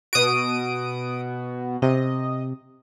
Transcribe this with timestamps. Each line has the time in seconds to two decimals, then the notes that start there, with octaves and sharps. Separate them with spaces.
0.13 B2 F#4 D#6 D7
1.82 C3 D#5